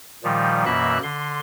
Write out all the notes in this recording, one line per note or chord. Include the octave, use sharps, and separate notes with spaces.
A#2 D#3 F3 G3
F#2 B2 E3 A#3 E5 F#6
D3 C6